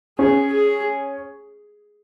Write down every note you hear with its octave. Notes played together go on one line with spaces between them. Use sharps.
C#4 G#4
G#4